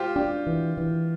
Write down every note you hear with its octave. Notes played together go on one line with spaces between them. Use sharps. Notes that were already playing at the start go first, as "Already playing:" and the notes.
Already playing: F4 G4 C5
D4 G4
E3
E3